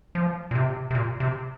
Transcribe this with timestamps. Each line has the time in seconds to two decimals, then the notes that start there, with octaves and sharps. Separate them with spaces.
0.15 F3
0.51 A#2
0.55 C3
0.91 C3
0.95 A#2
1.20 C3